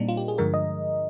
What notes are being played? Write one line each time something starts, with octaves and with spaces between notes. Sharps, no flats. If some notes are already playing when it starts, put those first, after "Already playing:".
Already playing: A#2 G3 A#3 C4 D4 D#4
F4
G4
G#4
G2 D3 F3 G#3 A#4
D#5